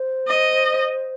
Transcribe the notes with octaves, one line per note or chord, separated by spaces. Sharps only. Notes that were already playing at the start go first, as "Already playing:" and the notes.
Already playing: C5
D#5